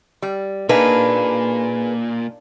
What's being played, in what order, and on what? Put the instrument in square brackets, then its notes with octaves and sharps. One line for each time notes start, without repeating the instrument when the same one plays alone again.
[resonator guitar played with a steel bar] G3
[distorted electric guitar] A#2 [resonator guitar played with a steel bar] A#3 D4 D#4 [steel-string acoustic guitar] G#4 B4